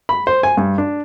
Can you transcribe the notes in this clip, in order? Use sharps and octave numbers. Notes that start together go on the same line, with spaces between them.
B5
C5
G#5
G2
D4